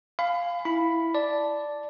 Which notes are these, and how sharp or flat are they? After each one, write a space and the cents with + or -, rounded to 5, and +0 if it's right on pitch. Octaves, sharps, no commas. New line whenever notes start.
F5 +0 G#5 +0 B5 +30
E4 +0 B5 +0
D5 +0 A5 +0